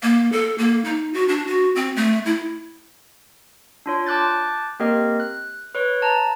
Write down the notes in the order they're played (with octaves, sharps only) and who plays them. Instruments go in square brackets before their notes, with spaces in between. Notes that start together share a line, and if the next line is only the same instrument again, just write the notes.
[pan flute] A#3
A4
A#3
D#4
F#4
D4
F#4
C4
A3
E4
[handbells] D4 F4 C#5
A5 D6 F#6 G6 A6
A#3 C4 G4 A#4 D#5
F#6
B4 C#5
A5 A#5